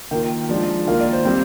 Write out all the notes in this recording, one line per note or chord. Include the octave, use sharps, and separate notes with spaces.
D#3 A#3 F4 G5
F3 G#3 D4
D#3 A#3 F4 F5
D5
C5
G3 C4